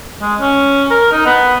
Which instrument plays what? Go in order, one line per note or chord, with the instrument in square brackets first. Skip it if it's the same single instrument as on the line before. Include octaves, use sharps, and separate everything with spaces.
[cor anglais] G#3
C#4
A#4
D#4
B3